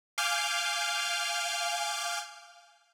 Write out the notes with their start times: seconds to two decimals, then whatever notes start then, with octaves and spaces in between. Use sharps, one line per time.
0.18 F5 G#5 D6 F6 G6